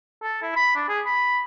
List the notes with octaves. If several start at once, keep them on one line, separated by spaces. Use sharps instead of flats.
A4
E4
B5
D4
G#4
B5